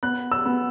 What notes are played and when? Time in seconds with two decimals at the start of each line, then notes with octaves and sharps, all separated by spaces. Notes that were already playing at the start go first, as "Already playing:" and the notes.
0.03 B3 F#6
0.32 E6
0.45 B3